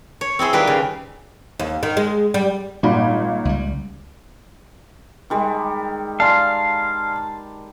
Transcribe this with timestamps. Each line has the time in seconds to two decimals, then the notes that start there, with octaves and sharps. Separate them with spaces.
0.21 C#5
0.39 C4 E4 G#4 C5
0.53 D#3 G3 F4 A#4 B4
0.67 C#3
1.59 D#2
1.83 D#3
1.97 G#3
2.34 G3
2.83 G#1 A#2 G3 B5
3.45 C#2 G3
5.30 D#3 G3 G#3
6.20 D5 F5 G#5 A5 C6